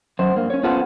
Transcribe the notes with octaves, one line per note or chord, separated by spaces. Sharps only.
F#2 C5
G2 A#3
C#4 C#5
B3 C#4 F4 A4 C5 F#5